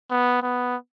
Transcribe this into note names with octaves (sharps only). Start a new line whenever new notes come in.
B3
B3